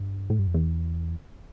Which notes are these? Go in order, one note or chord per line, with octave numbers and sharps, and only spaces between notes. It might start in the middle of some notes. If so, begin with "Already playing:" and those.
Already playing: G2
A2
G2
F2
E2